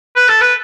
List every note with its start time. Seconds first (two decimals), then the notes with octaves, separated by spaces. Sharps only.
0.16 B4
0.28 A4
0.41 B4